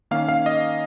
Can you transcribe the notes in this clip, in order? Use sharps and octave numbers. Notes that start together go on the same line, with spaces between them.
D#3 A#3 C#4 F5
F5
D#5